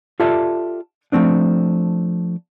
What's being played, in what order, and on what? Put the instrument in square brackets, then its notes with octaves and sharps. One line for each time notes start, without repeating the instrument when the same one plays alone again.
[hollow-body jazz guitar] F4 G4 A4 D5 E5
F3 A3 C4 D4